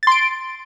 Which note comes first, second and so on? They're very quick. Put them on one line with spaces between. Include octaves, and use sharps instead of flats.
A6 C6 D7